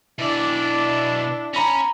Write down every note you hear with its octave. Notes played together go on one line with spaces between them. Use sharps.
B2 D4 E4 D5
C#4 A#5 B5 A#6